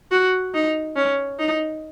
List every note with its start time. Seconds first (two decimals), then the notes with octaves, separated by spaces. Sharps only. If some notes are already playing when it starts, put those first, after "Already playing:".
0.11 F#4
0.54 D#4
0.96 C#4
1.39 D#4